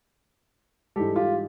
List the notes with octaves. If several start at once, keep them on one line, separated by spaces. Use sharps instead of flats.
G#2 E3 G3 G4 A4
F4 G4